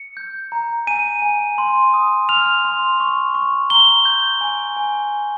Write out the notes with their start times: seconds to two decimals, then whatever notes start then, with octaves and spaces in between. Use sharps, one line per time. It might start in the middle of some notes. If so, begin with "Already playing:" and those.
Already playing: C#7
0.17 G6
0.52 A#5
0.87 G#5 D#7
1.22 G#5
1.58 C6
1.94 D#6
2.29 F6 F7
2.65 C6
3.00 C#6
3.35 C#6
3.70 A#5 G7
4.05 G6
4.41 G#5
4.77 G#5